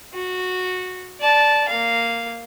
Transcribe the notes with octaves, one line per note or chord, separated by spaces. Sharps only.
F#4
D5 A5
A#3 F5